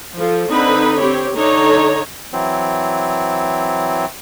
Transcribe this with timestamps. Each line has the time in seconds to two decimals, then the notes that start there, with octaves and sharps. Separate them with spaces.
0.16 F3 A4
0.48 D3 C4 D#4 B4 B5
0.99 C4 G4 C#5
1.36 D3 D4 D#4 A4 C#5 A#5
2.33 E3 F#3 C4